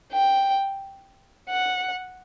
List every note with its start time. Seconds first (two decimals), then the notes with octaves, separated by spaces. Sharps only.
0.12 G5
1.49 F#5